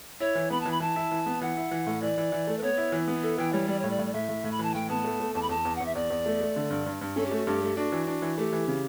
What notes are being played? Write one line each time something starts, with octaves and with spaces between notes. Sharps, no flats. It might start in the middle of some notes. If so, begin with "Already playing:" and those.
E4 C#5
E3
B3 B5
A5
E3
B5
E3 A5
E4
E3
B3
E3 F#5
E4
E3
A2
E3 D5
E3
E3
A3
B4
B3 C#5
E4
E3
B3
E4 A4
E3 G5
G3 C#5
G3 D5
A2 C#5
D5
A2
D5
A2 E5
A2
A2
B5
E3 A5
A2 G5
B3 A5
A3
A3
E2 A5
B5
E2 A5
E2
E2 F#5
E5
E2 D5
E2
A3
A3
D3
G2
G2
G2
C#4 A4
G4
A3 F#4
G2 G4
A3
D4 F#4
E3
D4
E3
A3 G4
E3
C#3